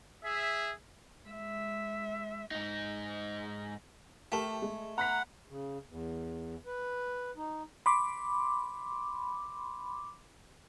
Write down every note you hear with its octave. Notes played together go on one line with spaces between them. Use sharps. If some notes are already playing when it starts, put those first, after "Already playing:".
G#4 E5
G#3 E5
G#2 D#4
A3 G4 A#4 A5
G#3
F#5 A#5 B5 B6
C#3
E2
B4
D#4
B5 C6 D6